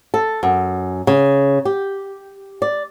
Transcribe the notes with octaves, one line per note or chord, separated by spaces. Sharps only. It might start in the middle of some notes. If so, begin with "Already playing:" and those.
A4
F#2
C#3
G4
D5